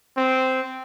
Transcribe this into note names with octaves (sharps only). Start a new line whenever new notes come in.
C4